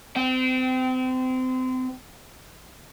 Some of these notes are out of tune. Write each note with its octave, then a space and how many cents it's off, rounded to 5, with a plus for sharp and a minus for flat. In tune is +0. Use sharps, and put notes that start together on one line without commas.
C4 -30 G5 -20